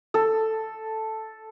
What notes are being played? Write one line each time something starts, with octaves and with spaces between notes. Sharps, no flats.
A4